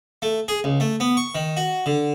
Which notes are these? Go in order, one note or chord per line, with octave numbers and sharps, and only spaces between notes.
A3
G#4
C#2
A3
B3
C#6
D#3
F#4
D3